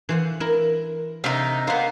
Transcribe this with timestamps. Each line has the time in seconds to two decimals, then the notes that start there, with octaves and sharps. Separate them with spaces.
0.09 E3 C5 F#5
0.40 E4 A#4
1.24 C3 D#4 D5 F5
1.67 A#3 B3 C5 F#5